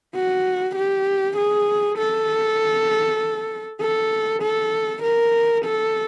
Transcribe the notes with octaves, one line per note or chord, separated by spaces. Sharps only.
F#4
G4
G#4
A4
A4
A4
A#4
A4